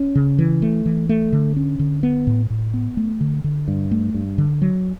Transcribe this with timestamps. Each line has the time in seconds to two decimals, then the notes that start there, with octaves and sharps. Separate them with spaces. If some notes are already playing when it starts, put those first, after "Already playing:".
Already playing: C#4
0.15 C#3
0.39 E3
0.62 A3
0.86 E3
1.09 A3
1.33 D3
1.57 C#4
1.79 D3
2.03 B3
2.27 A2
2.50 A2
2.74 B3
2.97 A3
3.21 D3
3.44 D3
3.68 G2
3.91 A3
4.14 G2
4.38 D3
4.62 F#3